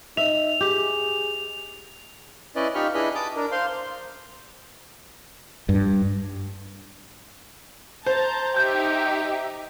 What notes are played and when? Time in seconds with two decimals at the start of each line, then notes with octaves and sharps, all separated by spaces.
0.17 D#4 E5 F7
0.61 G4 G#4
2.56 C#4 E4 B4 D5 D#5
2.75 D#4 F4 G4 B5 C#6 F6
2.94 D4 E4 G#4 B4 D#5 B5
3.15 A5 D6 D#6
3.36 D4 A#4
3.52 C5 F5 C6
5.69 G2
8.06 C5 A5 A#5 G6
8.57 D#4 G4 E5 G6